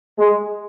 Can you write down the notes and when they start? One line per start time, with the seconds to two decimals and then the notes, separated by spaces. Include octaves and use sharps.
0.17 G#3